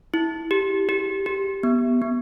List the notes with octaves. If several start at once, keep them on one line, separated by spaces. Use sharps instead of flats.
E4
G4
G4
G4
B3
B3